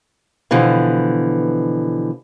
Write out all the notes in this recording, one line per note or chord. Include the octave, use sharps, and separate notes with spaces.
B2 D3 E3 F3